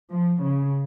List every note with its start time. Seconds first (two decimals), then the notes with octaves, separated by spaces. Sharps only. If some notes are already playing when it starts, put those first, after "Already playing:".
0.13 F3
0.43 C#3